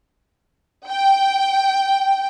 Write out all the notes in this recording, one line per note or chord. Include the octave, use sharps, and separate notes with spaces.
G5